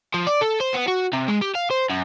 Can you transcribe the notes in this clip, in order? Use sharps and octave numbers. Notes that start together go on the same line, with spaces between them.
F3
D5
A4
C5
B3
F#4
C3
G#3
G4
F5
C5
F#2